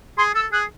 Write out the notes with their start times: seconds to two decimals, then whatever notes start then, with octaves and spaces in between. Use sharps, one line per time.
0.18 G#4 C6
0.35 A4 E6
0.52 G#4 F#6